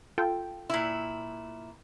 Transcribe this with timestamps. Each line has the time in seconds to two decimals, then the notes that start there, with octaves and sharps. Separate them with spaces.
0.18 F4 A4 G5
0.70 A#2 E4